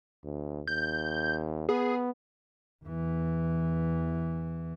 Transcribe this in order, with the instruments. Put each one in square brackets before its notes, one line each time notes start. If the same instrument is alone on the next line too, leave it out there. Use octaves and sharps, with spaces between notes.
[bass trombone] D2
[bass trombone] D#2 [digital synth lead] G6
[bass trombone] B3 [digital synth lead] G#4
[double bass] E2 E3